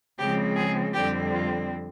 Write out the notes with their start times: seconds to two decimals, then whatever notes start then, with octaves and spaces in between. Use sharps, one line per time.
0.19 C#3 F3 G#3 C4 G4
0.56 G#4
0.94 F2 D3 G3 C4 G4
1.33 F4